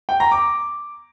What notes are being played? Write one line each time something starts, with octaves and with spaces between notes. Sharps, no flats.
G5
A#5
D6